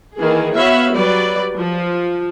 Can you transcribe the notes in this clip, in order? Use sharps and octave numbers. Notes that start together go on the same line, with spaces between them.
D#3 E3 A#3 G#4
B3 F#4 C#5 E5 F5 B5
F#3 G3 B4 D5
F3